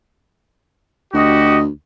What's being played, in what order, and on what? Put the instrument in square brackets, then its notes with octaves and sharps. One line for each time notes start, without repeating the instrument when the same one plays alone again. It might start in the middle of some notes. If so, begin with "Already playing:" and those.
[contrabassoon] D2 [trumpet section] F#4 G4 D#5